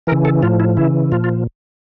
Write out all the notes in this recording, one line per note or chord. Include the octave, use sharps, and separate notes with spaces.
C#3 E3 A#4
A4
A2 F3 F4
E4
C#3 E3 E4
A#2 F3 F4
F4